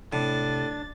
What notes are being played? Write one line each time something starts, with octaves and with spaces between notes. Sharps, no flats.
A2 C3 D4 A6